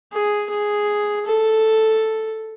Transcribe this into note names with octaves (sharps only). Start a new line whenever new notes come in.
G#4
G#4
A4